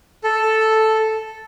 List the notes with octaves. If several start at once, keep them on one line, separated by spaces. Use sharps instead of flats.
A4